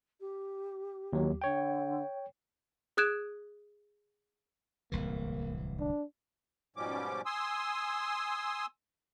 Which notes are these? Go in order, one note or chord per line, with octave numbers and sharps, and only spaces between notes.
G4
D#2 F#3
D3 C#5 G5
G#4 D#6 F#6 G#6 D7 E7
D1 C2 E3 A#3
D4
G#2 B2 F3 G3 C#4 D6
G#5 C6 D#6 E6